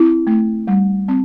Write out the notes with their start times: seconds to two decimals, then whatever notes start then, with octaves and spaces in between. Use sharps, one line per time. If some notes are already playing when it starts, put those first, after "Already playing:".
Already playing: C4 E4
0.27 A3
0.67 G3
1.08 C4